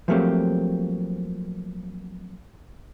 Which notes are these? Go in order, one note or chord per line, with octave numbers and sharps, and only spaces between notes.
F3 F#3 A3 A#3 C4 G4